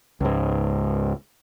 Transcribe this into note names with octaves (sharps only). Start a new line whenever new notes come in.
C#2 G#2